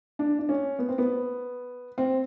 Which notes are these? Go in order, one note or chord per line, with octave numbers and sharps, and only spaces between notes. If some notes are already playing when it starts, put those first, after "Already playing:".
D4
D4
C#4
B3
C4
B3
C4